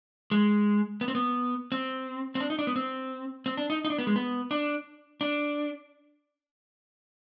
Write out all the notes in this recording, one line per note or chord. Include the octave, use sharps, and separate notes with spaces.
G#3
B3
C4
B3
C4
C4
D4
D#4
D4
B3
C4
C4
D4
D#4
D#4
D4
B3
G#3
B3
D4
D4